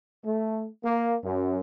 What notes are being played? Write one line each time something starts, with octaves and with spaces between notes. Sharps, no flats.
A3
A#3
F#2